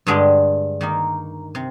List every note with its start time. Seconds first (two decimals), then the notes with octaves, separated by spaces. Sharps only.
0.07 G2 D3 G#3 D4 G4
0.81 D#3 A#3 D#4
1.55 C3